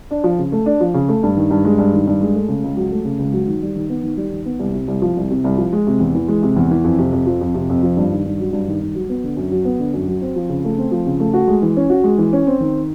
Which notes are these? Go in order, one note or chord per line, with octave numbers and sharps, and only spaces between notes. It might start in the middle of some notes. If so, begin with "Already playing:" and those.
D4
F3
C#3
A3
D4
F3
C#3
A3
G2
D#3
G2
G#3
G2
D#3
G2
G#3
A3
C#3
C#2
F#3
A3
C#3
C#2
F#3
D#3
G3
D#3
B3
D#3
G3
D#3
B3
C2
C3
C2
F3
C2
C3
C2
F3
G#3
C3
E2
E3
G#3
C3
E2
E3
F2
C3
F2
F3
F2
C3
F2
F3
G2
D#3
G2
F#3
G2
D#3
G2
F#3
B3
D3
F#2
F#3
B3
D3
F#2
F#3
C4
F3
C#3
A3
C4
F3
C#3
A3
F#4
G#3
E3
C#4
F#4
G#3
E3
C#4
C4
D#3